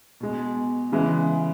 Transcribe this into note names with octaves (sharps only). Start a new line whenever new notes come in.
B2 G#3
C#3 E3 G#3